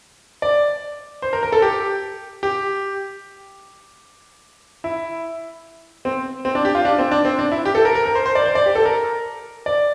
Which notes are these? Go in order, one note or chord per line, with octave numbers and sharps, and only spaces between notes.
D5
C5
A#4
A#4
A4
G4
G4
E4
C4
C4
D4
G4
F4
D4
C4
D4
C4
D4
E4
G4
A4
A#4
A#4
A#4
C5
C5
D5
C5
D5
G4
A4
A#4
D5